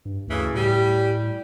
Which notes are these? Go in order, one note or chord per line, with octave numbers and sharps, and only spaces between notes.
G2
D2 A2 C#3 E3
A2 G3